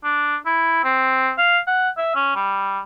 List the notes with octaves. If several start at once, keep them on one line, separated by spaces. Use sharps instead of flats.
D4
E4
C4
F5
F#5
E5
C#4
G3